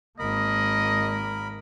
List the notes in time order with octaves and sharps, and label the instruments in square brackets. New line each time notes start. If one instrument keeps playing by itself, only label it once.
[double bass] G#1 A#3 [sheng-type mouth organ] A#4 B5 [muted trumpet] D#5